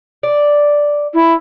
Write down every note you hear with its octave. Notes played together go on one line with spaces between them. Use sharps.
D5
E4